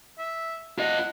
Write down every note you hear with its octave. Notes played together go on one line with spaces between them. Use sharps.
E5
F4 D#5 F#5